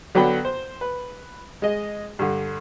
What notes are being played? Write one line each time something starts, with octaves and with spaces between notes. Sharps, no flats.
D3 F#3 B3 D5 G5 B5
C5
B4
G#3 D#5
G2 D3